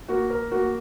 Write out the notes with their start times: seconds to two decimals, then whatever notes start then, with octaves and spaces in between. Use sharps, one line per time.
0.08 A#3 F#4
0.30 A#4
0.51 A#3 F#4